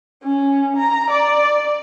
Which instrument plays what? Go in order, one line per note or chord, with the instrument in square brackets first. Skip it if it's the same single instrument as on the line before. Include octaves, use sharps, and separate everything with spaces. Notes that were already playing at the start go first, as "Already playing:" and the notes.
[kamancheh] C#4
A#5
D5